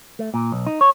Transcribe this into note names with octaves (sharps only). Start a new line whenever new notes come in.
A3
A#2
B1
D#4
C#5